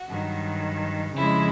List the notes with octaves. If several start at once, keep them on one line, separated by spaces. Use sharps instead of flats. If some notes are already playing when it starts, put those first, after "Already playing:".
Already playing: F#4
G2 D#3 F#3
F2 C#3 F3 G#3 E4